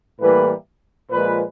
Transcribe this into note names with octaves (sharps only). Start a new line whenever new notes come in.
A2 E3 G3 A#3 B4
A#2 F3 G#3 B4